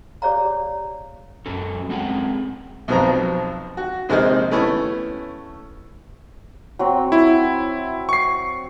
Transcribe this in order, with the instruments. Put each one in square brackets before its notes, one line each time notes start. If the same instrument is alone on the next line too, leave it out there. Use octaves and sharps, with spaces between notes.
[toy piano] G4 G#4 C#5 D5 F5 A#5
[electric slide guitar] F#2 F#3 C#4 A4
G#3 A3 C4 G#4 F#5
[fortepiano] B1 F2 B2 C4 A#5
F#4
A#1 C3 G#3 D#4 C5 F6
A3 B3 C#4 E4
[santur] F#3 C4 C6
[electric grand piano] E4
C#6 C7